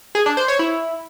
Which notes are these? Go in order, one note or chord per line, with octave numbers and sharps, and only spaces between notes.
G#4
D4
C5
C#5
E4